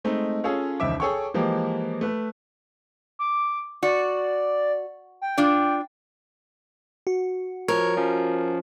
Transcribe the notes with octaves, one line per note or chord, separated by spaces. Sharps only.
G#3 A3 C4 D#4
C#4 F4 G#4 A4 C#5 F5
E1 C#2 D#3 F3 E5 D6
G#4 A4 C#5 G5 C#6
E3 F3 G#3 A#3 G4
A3 B4
D6
F#4 D5
G5
D4 F4 D5
F#4
F3 A#4 C#5
F3 C#4